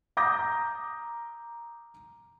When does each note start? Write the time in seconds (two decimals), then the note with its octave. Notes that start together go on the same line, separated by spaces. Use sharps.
0.17 A#5 D6 D#6 G6 A#6